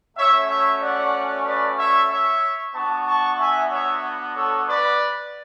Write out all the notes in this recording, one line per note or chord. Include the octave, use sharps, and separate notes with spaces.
A3 C#4 F#4 C#5 E5
C#5 E5
D5 F#5
B4 D5
C#5 E5
C#5 E5
B3 D4 F#4 A5 C#6
A5 C#6
E5 G#5
C#5 E5
A4 C#5
B4 D5